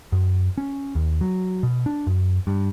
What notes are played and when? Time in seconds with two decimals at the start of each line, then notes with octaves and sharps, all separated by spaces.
0.12 F#2
0.58 C#4
0.95 D#2
1.21 F#3
1.63 B2
1.86 D4
2.07 F#2
2.47 G2